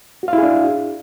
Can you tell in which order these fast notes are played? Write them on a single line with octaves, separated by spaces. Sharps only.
F#4 F5 E4 G#4 D4